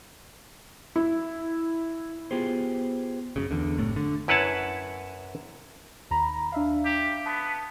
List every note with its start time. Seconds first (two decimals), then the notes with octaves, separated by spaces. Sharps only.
0.96 E4
2.31 B3 F4 G4 G#4 C5
3.36 F#2 A#2 C#3
3.51 E2 D3
3.78 F#1 A2 C3 A3
3.96 D3
4.28 F#2 E4 B4 C#5 F#5 A5
6.11 D#2 A#5 B5
6.52 D4 E5 F5
6.85 G4
7.26 B3 A5